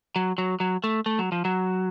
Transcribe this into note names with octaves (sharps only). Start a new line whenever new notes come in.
F#3
F#3
F#3
A3
A3
F#3
F3
F#3